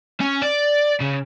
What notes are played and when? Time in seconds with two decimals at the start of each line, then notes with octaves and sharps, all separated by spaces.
0.20 C#4
0.42 D5
1.01 C#3